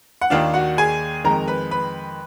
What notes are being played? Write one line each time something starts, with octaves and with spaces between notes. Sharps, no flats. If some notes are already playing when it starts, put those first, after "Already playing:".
F#5
D#2 D#3 A#3 D4 F4 F5
F#4 F#5
G#4 G#5
F2 D#3 G#3 A#4 A#5
B4 B5
B4 B5